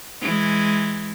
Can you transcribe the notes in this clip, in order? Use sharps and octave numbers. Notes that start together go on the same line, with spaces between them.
E3 G#3